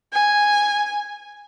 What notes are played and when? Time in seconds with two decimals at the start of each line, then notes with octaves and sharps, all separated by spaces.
0.13 G#5